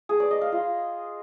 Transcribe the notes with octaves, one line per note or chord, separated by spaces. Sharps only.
G#4
D5
D#5
F5
F4